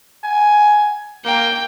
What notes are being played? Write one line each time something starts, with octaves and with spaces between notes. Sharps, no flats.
G#5
A#3 G5